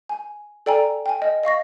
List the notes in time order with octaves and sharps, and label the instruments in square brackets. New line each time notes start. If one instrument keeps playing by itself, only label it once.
[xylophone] G#5
A4 D5 G5 G#5 A#5
G5 G#5
D#5
D#5 F5 C#6 A#6